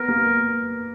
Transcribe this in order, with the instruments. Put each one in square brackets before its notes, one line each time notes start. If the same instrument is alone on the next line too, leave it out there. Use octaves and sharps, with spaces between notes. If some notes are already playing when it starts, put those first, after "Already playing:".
Already playing: [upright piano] B3 [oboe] A#4
[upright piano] A#3